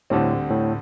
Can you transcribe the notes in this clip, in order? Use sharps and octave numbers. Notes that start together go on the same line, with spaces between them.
D2 A2 D3 G3 C4
A2